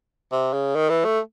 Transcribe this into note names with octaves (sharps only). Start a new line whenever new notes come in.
C3
C#3
D#3
E3
A3